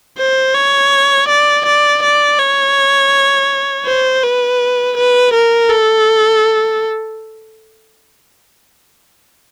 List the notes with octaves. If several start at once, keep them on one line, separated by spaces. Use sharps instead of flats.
C5
C#5
D5
D5
D5
C#5
C5
B4
B4
A#4
A4